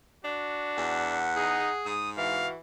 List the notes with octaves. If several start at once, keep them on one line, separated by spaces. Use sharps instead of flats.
D4 F#4
E2 F#5
D#4 G#4
G#2 D#6
E3 F#4 F5